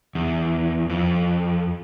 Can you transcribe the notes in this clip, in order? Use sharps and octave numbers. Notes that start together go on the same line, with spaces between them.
E2
F2